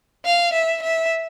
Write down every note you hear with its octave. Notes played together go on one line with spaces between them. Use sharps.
F5
E5
E5